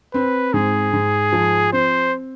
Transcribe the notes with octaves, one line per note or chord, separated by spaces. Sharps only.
C4 B4
G#2 G#4
G#2
F3
C4 C5